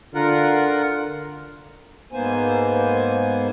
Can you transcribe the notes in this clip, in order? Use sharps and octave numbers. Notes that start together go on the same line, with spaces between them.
D3 F4 A#4 F#5
G#2 A#3 B3 C5 G#5